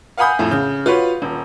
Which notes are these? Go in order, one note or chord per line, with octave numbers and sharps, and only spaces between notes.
F5 F#5 G#5 B5 D#6 G6
F2 A2
C#3 G6
F4 F#4 B4 C#5
D#1